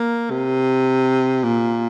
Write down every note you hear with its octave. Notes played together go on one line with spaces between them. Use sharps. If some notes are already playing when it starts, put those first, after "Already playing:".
Already playing: A#3
C3
A#2